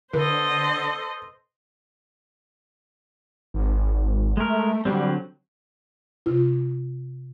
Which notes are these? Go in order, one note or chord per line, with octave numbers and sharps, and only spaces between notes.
D3 A4 B4 C5 D#5
G#1
G#3 A3 A#4
D3 F#3 G3 C4
C3 F4